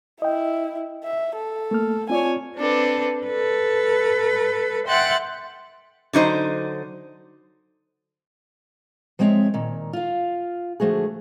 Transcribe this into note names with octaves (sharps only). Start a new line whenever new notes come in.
E4 D#5 G5
E5
A4
A3 A#3 F6
C4 F4 C#5 D5 G#5
C4 D4 A4 B4
A4 B4
E5 F#5 G5 C6 F#6 A6
D3 F#3 D#4 C5
F3 G#3 C4 B4 C#5 E5
A#2 D#3
F4 F5
D3 F3 A3 F#4 G#4